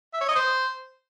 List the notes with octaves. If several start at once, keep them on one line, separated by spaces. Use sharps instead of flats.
E5
C#5
D#5
C5